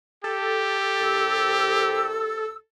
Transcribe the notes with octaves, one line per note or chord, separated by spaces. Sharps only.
G4 A4
C2 C3 E6